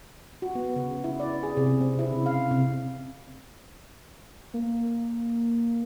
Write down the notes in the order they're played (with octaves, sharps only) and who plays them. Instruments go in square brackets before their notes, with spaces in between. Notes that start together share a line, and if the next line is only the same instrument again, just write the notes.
[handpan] F#4
B3
C#3
E4
D5
G#4
C3
C4
E4
C#3
F5
C3
[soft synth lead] A#3